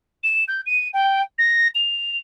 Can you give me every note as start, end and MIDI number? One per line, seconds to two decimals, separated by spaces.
0.23 0.44 100
0.48 0.61 91
0.66 0.89 99
0.93 1.21 79
1.38 1.68 94
1.75 2.16 101